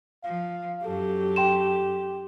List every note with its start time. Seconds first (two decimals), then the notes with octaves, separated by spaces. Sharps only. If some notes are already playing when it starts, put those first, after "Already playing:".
0.24 F3 F5
0.85 F#2 F#3 G4 A4
1.36 G5 C6 E7